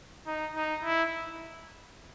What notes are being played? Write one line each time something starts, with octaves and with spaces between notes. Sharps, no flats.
D#4
D#4
E4